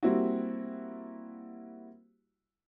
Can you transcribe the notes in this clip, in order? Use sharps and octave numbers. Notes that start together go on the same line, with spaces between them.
G3 A#3 C4 E4 F#4